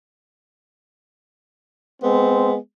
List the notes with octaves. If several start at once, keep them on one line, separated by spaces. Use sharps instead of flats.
G#3 B3 C4